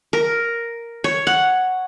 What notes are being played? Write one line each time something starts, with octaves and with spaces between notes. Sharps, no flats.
A#4
C#5
F#5